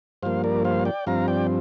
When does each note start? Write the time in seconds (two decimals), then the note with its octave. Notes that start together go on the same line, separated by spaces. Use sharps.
0.23 G2 F3 A#3 C5 F5
0.44 A#4 D5
0.64 C5 F5
0.85 D5 G5
1.07 G2 F3 C4 F5 A#5
1.28 D5 G5